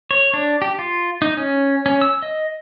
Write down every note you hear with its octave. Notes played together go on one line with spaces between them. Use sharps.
C#5
D4
G4
F4
D#4
C#4
C#4
E6
D#5